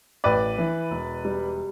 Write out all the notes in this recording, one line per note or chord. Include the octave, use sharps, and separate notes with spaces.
A1 B4 D5
E3
E1
G3